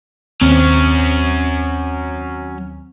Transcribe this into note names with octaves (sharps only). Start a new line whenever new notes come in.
D#2 F#3 C4 C#4